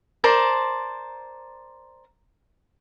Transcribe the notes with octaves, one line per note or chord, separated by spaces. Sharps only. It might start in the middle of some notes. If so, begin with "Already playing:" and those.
A#4 C5 D5 A5